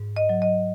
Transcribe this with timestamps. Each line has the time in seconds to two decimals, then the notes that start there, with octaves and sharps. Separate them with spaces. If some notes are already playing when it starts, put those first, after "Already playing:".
Already playing: G#2
0.17 D#5
0.29 F#3
0.42 D#5